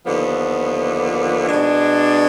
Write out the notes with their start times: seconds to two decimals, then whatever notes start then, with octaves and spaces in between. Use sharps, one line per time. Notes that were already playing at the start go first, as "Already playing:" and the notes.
0.06 D#2 D3 F3 B3
1.48 B2 G#3 D4